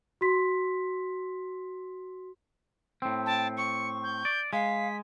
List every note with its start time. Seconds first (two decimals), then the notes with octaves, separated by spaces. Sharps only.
0.21 F#4 C6 B6
3.02 A2 C4
3.26 G5 A5
3.57 C#6 C#7
4.03 G6
4.25 D5
4.53 G#3 F5 B6